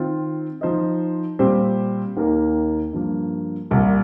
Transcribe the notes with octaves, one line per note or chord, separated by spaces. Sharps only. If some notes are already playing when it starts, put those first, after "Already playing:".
Already playing: D#3 C4 F4
F3 D#4 C5 D#5
A#2 G3 C4 G4 C5
D#2 D#3 A#3 D#4 A#4
G2 F3 A#3
C2 A#2 G3 A#3